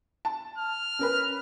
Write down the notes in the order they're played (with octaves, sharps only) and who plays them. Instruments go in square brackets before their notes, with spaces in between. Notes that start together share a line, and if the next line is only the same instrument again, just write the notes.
[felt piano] A5
[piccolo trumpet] F6
[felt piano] C#4 A#4 B4